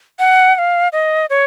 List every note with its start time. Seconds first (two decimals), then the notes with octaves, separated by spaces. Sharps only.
0.19 F#5
0.55 F#5
0.58 F5
0.93 D#5
1.30 C#5